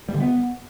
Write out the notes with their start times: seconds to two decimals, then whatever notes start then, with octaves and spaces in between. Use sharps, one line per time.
0.09 G3
0.14 D3
0.20 B3